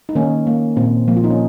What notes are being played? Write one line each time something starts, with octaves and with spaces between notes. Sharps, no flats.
D#4
D#3 A#3 C#4
A#3
A#2 C4
F3 A#3
F4
D#4
C#4